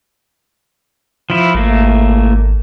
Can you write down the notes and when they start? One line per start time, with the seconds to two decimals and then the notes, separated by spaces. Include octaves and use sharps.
1.30 F3 E4
1.54 G#1 A3 A#3